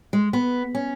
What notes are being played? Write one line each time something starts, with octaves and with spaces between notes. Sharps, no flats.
G#3
B3
C#4